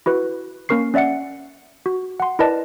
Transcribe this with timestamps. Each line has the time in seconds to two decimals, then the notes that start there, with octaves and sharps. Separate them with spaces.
0.06 E4 F#4 B4
0.69 A#3 C#4 A#4 C#6 C7
0.94 C#4 D5 E5 F#5 C#7
1.86 F#4
2.20 F#5 C6
2.39 E4 A#4 B4 D5 D#5 A5